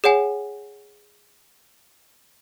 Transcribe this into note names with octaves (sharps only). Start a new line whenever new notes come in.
G#4 C#5 F#5 G#5